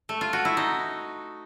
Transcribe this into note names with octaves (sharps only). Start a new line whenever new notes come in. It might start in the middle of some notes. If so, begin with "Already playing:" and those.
A3
F4
F#4
E4
D#4